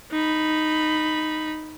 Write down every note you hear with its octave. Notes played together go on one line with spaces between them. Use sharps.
D#4 B5